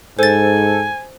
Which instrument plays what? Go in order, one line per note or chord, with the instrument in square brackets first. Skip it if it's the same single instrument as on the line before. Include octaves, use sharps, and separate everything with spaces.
[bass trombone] G#2 [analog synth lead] A4 [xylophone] C5 A6 [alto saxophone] G#5